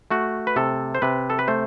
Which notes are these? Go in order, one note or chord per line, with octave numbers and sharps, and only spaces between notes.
A3 F#4
B4
C3 A4
C5
C3 B4
A4
B4
A3 C5